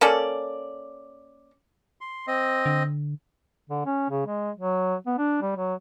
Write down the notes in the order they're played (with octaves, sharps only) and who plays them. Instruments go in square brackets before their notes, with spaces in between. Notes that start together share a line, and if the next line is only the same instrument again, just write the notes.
[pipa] A#3 C#4 A4 D5
[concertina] C6
C4 D#5
[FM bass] D3
[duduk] D3
C#4
C#3
G#3
F#3
B3
D4
G3
F#3